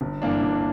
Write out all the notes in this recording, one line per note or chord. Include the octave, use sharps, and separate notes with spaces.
G1
G2 E3 A#3 D4
G1